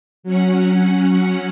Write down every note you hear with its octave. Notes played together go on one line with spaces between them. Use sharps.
F#3 C#4 F#5